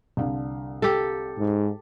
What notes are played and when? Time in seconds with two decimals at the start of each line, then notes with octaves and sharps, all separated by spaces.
0.17 C2 D3 F5
0.82 G4 A4
1.38 G#2